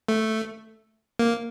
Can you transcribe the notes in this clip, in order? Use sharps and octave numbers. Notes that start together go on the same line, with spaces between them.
A3
A#3